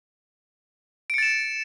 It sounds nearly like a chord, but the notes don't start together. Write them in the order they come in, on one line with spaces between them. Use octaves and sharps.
D7 C#7 A6 E7